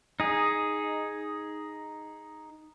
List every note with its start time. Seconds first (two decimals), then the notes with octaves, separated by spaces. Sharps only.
0.20 D#4 G#4